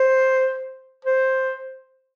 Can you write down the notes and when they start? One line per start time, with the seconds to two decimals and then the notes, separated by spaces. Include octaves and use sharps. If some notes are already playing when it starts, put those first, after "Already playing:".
Already playing: C5
1.05 C5